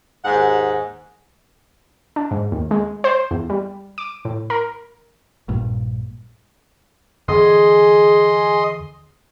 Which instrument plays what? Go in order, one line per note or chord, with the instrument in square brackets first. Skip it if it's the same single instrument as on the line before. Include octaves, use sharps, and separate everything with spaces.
[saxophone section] D#2 G#2 F#5
[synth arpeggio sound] D4
G#2
D#2
G#3
C5
E2
G3
D6
A2
A#4
[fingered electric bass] A#1 G2 A#2
[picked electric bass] E2 D3 [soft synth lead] G#4 [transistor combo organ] D#5 C6